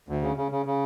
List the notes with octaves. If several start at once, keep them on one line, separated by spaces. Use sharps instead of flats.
D2
C#3
C#3
C#3
C#3